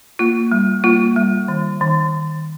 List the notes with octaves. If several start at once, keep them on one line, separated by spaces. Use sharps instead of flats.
A#3 F4
G3
A#3 F4
G3
D#3
D#3